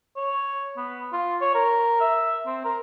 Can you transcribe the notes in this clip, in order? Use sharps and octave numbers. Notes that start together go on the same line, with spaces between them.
C#5
B3
F4
C#5
A#4
E5
C4
A#4